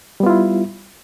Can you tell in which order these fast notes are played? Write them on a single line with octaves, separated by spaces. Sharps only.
G3 B3 F4 E4